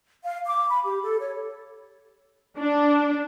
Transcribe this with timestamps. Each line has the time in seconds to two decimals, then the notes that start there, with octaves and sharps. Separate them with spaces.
0.24 F5
0.46 D6
0.69 B5
0.84 G4
1.02 A4
1.19 C#5
2.58 D4